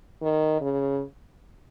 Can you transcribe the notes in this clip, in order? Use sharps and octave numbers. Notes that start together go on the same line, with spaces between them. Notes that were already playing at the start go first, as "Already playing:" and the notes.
D#3
C#3